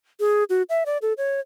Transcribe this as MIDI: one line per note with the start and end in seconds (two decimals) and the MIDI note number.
0.20 0.44 68
0.50 0.63 66
0.69 0.84 76
0.86 0.98 74
1.02 1.13 69
1.18 1.40 73